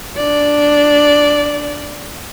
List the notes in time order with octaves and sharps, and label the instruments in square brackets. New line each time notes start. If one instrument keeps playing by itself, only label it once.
[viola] D4 D5